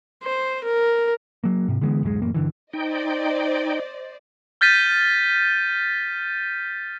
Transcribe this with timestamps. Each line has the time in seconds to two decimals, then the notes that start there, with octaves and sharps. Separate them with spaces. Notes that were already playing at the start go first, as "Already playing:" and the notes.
0.24 C5
0.64 A#4
1.44 F#3 A#3
1.68 G#2 C3
1.81 D3 E3 G#3 B3
2.03 D1 F#2 F3 G#3
2.22 A1 F#2 A#3
2.34 G1 D3 E3
2.73 D#4 C5 D5 D#5 G5
4.61 F6 G6 A6 B6 D#7